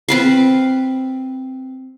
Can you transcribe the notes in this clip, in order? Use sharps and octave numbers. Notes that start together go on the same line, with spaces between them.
C4 B4 F5